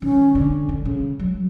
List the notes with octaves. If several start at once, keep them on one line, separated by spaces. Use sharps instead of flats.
D#3 C#4
D3
D3
C#3
F#3